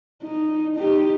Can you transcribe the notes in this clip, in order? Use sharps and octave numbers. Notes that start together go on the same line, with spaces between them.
D#4
D#4 G4